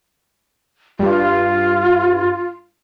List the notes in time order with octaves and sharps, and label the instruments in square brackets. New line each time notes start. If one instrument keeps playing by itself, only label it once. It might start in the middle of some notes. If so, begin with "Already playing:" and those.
[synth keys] G2 [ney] F4